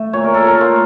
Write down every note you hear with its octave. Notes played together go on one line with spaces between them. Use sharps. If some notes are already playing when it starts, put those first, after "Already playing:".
Already playing: A3 E5
A#2 C#5
A#4
A4
A#4
A3 F4